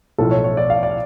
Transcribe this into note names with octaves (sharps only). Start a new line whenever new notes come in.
B1 A2 F3 A4
C#5
C#5
D5
F5
D5